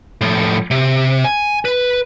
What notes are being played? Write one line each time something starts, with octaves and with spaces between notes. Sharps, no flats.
A2 F3
C3
G#5
B4